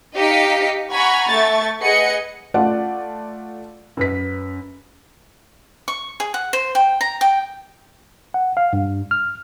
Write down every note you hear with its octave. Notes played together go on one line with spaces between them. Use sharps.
D#4 G4 D#5 F5 B6 C#7
F#5 G#5 A#5 B5 C#6
A3 C#6 A6
G#4 B4 D#5 F#5 C#7
A3 F4 D5 F#5
F#2 B4 B6
C#6
G#4
F#5
C5
G5
A#5
G5
F#5
F5
G2
F6